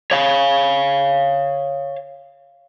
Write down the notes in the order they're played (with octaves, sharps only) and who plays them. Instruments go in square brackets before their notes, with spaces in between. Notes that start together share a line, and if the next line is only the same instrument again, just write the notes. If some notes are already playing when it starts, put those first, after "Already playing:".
[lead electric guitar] C#5 F5